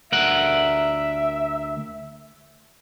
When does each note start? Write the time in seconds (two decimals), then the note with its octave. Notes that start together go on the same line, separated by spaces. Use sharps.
0.12 D2 A#4 E5 F#5